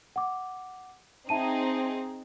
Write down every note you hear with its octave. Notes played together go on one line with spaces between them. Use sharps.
F#5 D6
C4 D#4 G#4 E5 A5 D#7